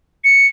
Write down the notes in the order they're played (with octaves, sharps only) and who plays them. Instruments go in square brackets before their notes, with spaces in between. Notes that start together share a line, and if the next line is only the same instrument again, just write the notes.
[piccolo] C#7